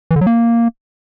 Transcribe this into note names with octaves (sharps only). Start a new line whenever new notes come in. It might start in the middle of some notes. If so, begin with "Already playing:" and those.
E3
D3
F#3
A#3